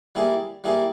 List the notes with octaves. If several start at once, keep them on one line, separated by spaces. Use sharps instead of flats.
G3 A#3 E4 G#4
G3 A#3 E4 G#4